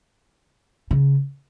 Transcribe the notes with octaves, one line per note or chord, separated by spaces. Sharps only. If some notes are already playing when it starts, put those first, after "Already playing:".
C#3